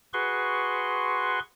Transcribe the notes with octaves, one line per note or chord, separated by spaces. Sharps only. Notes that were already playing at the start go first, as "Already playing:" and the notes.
F#4 G#4 B4 C6 C#6